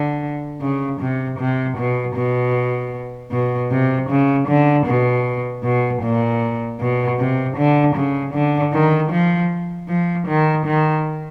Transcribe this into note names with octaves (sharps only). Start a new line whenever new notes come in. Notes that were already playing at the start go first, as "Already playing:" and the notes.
Already playing: D3
C#3
C3
C3
B2
B2
B2
C3
C#3
D3
B2
B2
A#2
B2
C3
D3
C#3
D3
D#3
F3
F3
D#3
D#3